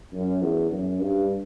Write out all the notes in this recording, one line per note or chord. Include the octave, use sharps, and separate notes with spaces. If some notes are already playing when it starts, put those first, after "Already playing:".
F#2
E2
F#2
G2